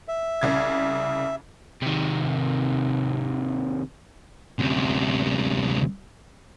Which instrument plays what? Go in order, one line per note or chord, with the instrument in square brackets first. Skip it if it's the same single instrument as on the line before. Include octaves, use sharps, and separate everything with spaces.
[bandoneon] E5
[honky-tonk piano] C2 C#3 G#6
[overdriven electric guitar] C3 D#3
[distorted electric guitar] D2 C3